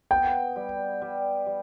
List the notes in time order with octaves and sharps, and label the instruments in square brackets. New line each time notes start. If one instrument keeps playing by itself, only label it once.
[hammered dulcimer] B3 [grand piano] G5
[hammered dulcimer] G3
G3
G3